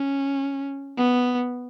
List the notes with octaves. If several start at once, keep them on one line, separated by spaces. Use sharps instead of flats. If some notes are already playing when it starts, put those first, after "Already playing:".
Already playing: C#4
B3